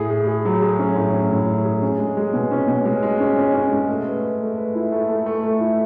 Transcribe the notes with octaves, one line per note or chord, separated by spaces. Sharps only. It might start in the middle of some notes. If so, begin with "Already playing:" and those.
Already playing: A2 G#4
G#4
G#4
F#3
G#4
C#4
A2
C#4
A2
A2
G#4
C#4
G#3
G#3
B2
C#4
B2
G#3
G#3
C#4
C#4
C#4
G#3
A3
B4
B4
A3
B4
E4
A3
A3
A3
A3
E4